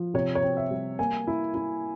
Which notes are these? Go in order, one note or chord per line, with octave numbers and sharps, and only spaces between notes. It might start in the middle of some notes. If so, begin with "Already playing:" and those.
Already playing: F3
C3 C#5
C#5
C4
E5
G3
A#3 G#5
E4
E4